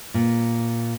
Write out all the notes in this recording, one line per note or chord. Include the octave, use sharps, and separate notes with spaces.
A#2